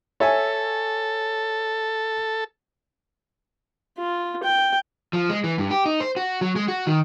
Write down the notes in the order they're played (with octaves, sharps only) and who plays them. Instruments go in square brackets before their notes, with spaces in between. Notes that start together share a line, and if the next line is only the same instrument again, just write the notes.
[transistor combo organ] A4 [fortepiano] C#5 E5 G#5
[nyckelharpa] F4
G5
[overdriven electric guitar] F3
G#3
E3
G2
G4
D#4
C5
F#4
F#3
G#3
F#4
D#3